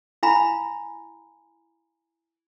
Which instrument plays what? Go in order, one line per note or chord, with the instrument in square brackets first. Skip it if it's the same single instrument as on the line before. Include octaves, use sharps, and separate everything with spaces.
[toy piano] E4 F5 G#5 A#5 B5